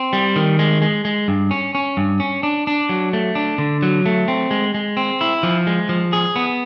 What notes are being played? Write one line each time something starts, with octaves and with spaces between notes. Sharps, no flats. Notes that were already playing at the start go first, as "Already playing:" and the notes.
Already playing: C4
G3
D#3
G#3
G#3
G#3
G2
C#4
C#4
G2
C#4
D4
D4
F#3
A3
D4
D3
F#3
A3
C4
G#3
G#3
C4
E4
F3
G#3
F3
G#4
B3